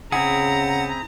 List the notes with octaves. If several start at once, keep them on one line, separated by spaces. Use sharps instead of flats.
C#3 C4 E4 G#4 F#5 A#5